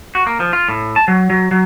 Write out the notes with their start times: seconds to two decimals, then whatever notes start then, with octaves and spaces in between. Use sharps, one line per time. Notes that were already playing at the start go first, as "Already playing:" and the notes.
0.15 F#4
0.27 A#3
0.40 F3
0.53 F4
0.69 A2
0.96 A5
1.08 F#3
1.30 F#3
1.51 F#3